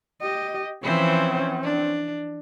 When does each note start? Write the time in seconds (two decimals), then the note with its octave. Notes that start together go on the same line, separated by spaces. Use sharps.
0.22 G4 D#5
0.83 E3 F3 C4 C#4 C5
1.63 D4